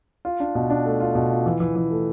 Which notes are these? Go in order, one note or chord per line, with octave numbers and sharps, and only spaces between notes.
F4
D4
B2
D4
A3
F4
B2
F4
E3
E3
E3
A3